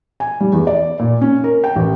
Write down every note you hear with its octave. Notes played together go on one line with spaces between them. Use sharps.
G#5
G3
E2
D5
A#2
C#4
A#4
G5
A1